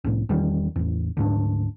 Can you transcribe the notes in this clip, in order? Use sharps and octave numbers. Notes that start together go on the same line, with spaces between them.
C2 A2
E2 D#3 G3
A1 E2
D2 G#2 D4